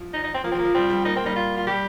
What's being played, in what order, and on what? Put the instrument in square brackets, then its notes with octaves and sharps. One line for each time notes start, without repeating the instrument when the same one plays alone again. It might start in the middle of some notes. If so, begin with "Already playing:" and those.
Already playing: [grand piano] F3
[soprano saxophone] D#4
D#4
C4
[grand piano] F3 [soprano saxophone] A#3
[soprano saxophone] C4
[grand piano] F3
[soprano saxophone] A#3
[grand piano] F3
[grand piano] G3 [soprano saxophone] C4
[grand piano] G3
[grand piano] A#3 [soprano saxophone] D#4
[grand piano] A#3 [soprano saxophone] C4
[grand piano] G3 [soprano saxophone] D#4
[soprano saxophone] F4
F4
[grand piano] G3 [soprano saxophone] G4